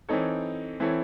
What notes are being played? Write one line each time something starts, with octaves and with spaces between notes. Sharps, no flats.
E3 C4 D#4 A4 C#5
E3 C4 E4 A4 C#5